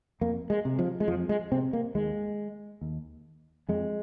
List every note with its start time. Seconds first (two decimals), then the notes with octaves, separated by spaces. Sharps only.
0.21 F2 A#3
0.50 G#3
0.65 C3
0.79 F3
1.00 G#3
1.08 F2 F3
1.29 G#3
1.52 C3 C4
1.73 A#3
1.95 D#2 G#3
2.81 D#2
3.69 F2 G#3